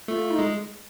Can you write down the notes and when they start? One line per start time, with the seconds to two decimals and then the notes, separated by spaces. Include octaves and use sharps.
0.08 A3 F4
0.31 D#4
0.39 G#3